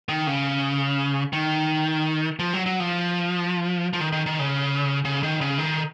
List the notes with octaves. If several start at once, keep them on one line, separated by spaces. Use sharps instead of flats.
D#3
C#3
D#3
F3
F#3
F#3
F3
F3
D#3
D#3
D#3
C#3
C#3
D#3
C#3
D#3